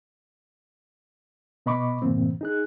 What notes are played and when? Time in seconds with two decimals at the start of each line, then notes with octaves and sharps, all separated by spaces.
1.66 B2 B3 D#5 B5 C#6 D6
2.02 F#2 A2 C3 E3 A#3 C4
2.41 D#4 G#4 F#6